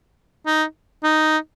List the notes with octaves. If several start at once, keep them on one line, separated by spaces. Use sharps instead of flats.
D#4
D#4